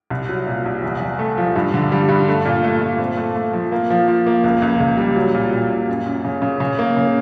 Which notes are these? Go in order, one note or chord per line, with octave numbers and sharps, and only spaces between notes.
C2
F#3
A#2
C2
E2
E2
A3
F3
G2
D3
G3
G2
A3
A#2
A3
A#2
C4
A3
A3
F3
A#3
F3
F3
A#3
C#2
C#2
C#2
G3
F#3
A#2
A#2
A#2
F#2
F#2
C#3
C#3
C#3
A#3
C#3